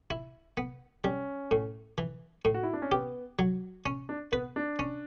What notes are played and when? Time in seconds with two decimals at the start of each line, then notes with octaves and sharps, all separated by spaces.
0.10 E4
0.57 B3
1.04 G3 C#4
1.51 A2
1.98 E3
2.45 A2
2.54 F#4
2.63 E4
2.73 D4
2.82 C#4
2.92 B3 G4
3.39 F#3
3.86 C#4
4.09 D4
4.32 B3 B4
4.56 D4
4.79 C#4